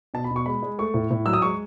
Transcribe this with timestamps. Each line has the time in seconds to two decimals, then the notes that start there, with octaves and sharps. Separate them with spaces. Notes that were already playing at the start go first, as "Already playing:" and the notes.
0.14 B2 A5
0.24 B5
0.31 B2
0.36 C#6
0.46 G#3 B5
0.62 G#3
0.79 A3 C#6
0.94 A2
1.11 A2
1.26 F#3 E6
1.33 D#6
1.42 G#3 C#6